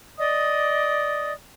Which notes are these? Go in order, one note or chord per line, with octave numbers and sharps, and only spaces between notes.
D5 D#5 D#6